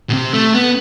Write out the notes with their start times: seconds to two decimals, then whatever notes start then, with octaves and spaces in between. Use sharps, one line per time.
0.09 B2
0.13 C3
0.33 A3
0.54 B3